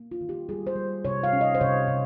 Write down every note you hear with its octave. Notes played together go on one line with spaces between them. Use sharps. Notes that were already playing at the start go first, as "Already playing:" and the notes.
Already playing: A#3
F4
D#3
G4
G3 G#4
C5
G3
C3 C#5
F5
C#4
D#5
C5
C3 C#5
C3